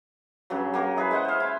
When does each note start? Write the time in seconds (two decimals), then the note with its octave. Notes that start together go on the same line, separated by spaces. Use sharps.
0.50 G2 C#3 F#3
0.74 F#3 A#3 A#5
0.96 E4 G#4 B4
1.11 G#3 C5 F#5
1.25 C5 F5
1.40 E4